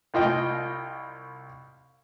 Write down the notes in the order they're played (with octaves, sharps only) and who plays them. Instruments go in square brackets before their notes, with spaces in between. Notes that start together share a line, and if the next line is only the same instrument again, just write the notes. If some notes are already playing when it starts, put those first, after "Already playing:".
[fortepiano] C2 F4 D#5 G5